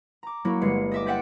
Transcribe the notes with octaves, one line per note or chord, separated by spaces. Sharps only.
A#5 D6
F#3 A#3 E4 F#4
G1 G#3 C7 C#7
D#5 E5 D6
C5 D5 E5 F#5 G5